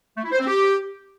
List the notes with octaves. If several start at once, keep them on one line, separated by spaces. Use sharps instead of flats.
A3
E4
C5
C4
G4